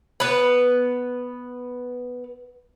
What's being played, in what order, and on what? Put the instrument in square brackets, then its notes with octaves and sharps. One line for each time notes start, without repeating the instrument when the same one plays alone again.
[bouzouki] B3 B4